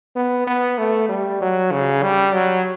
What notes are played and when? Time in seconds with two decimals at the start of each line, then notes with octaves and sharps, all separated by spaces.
0.16 B3
0.47 B3
0.78 A3
1.09 G3
1.41 F#3
1.72 C#3
2.03 G3
2.34 F#3